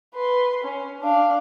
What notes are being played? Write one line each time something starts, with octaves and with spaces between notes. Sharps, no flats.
B4 C6
C#4
D4 F5